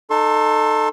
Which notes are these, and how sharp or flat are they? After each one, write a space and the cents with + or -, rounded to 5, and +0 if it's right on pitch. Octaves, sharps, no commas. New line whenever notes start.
D#4 -20 A4 +5 C6 +35